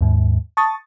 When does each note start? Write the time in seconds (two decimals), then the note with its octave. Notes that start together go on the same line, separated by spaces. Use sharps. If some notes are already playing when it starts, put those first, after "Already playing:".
0.01 D#2 G#2
0.57 A5 C#6 D#6 A6